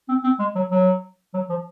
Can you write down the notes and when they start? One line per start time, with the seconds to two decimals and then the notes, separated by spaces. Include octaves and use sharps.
0.09 C4
0.24 C4
0.39 G#3
0.55 F#3
0.71 F#3
1.34 F#3
1.50 F3